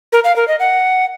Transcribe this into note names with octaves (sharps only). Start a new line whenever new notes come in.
A#4
F5
A#4
D#5
F#5